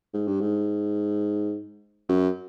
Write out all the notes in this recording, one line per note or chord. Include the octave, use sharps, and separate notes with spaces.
G#2
G2
G#2
F#2